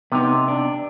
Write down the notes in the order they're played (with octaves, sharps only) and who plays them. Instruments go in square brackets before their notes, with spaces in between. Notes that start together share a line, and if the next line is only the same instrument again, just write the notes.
[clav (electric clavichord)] C3 [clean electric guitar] B3 D#4
[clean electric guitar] D4